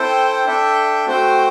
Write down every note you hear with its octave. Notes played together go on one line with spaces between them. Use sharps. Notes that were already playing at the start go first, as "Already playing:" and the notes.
Already playing: C4 E4 A4 C5 G5
D4 A4 E5 G5
A3 C4 F#4 C5 G5